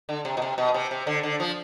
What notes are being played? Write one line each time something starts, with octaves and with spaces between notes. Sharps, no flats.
D3
C3
B2
C3
B2
C3
C3
D3
D3
F3